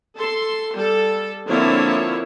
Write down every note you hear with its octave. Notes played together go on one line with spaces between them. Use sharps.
A4 C6
G3 A4
D3 F3 A#3 C4 E4 C#5